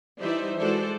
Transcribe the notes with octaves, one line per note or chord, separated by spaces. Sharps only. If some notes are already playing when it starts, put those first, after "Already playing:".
E3 G3 D#4 C5 D5 E5
E3 G#3 F#4 A4 C5 D5